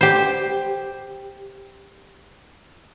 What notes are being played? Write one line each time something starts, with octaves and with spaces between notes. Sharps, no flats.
G4 C5